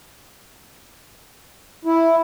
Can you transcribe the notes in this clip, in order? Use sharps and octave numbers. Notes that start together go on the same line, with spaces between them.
E4